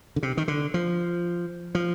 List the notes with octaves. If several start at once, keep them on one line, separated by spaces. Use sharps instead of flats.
D3
C3
D#3
D3
F3
F3